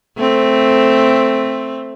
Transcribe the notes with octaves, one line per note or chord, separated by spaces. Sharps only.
A3 C4